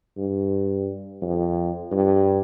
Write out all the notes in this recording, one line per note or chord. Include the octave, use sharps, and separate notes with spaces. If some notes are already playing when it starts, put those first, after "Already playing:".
G2
F2
G2